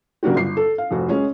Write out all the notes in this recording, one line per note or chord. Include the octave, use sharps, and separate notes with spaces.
C#3 F#3 A#3 D4 F#4 G4
G1 C7
A4
F5
F1 F2 F#4
G#3 C#4 F4